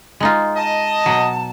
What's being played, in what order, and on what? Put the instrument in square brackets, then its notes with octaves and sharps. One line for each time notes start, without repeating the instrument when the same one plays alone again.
[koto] G#3 D#4 F4
[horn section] D#5 [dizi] A5
[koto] B2 F#3